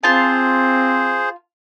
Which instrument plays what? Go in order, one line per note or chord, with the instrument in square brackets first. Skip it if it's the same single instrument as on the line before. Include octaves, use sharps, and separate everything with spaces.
[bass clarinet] C4 [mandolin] F4 A5 [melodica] G#4 C5